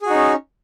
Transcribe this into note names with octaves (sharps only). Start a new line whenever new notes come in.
C#4 D#4 F#4 G#4